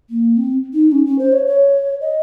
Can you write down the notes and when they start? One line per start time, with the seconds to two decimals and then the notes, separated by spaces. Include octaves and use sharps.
0.10 A#3
0.37 C4
0.74 D#4
0.91 C#4
1.05 C#4
1.18 C5
1.32 C#5
1.46 C#5
2.01 D#5